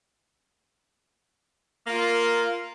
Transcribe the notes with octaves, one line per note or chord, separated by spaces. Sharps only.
A#3 F4